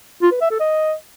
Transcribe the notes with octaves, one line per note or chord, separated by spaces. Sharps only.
F4
B4
E5
A4
D#5